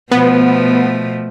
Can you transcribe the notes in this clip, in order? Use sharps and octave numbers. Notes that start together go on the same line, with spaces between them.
B2 F3 A3 B3